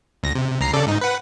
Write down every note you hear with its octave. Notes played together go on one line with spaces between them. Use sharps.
D2 A#6
C3
C#2 A#5 C7
C#3 A4 D5
G#2 D#4
B4 F#5